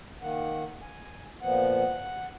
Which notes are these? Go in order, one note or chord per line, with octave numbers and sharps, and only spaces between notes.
D#3 A#3 F#5
G#5
A#2 F3 B3 F#5